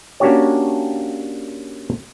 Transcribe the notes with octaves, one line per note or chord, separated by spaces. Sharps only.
A#3 C#4 D4 F#4 G4 C#5